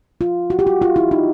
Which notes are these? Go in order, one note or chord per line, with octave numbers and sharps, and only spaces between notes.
F4
F#4
G4
F#4
F4
E4
D#4